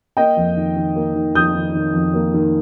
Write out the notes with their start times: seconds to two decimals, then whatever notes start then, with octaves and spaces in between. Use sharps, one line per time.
0.17 A#3 D#5 G5
0.37 F2
0.56 D#3
0.76 D#3
0.96 A#3
1.15 D#3
1.35 F2 D#6 G6
1.55 D#3
1.74 D#3
1.93 F2
2.14 A#3
2.34 D#3